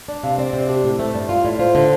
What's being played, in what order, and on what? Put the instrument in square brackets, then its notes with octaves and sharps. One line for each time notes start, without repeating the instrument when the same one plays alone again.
[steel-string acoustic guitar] D4 [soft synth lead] D5
[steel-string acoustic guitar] C3 [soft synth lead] F5
[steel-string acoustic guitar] C4 [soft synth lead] D5
[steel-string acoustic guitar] C3
[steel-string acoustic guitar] D4 [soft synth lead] G4
[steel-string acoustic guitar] A2
[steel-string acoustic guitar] A3 [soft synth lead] C5
[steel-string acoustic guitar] G2 [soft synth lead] D5
[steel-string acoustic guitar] F4 [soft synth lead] F5
[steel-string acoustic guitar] A2 [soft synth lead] D5
[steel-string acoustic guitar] F4 [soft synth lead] C5
[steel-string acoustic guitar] D3